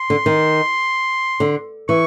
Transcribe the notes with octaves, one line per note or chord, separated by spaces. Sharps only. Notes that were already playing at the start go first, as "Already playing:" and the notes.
Already playing: C6
D3
D#3
D3
E3 C#6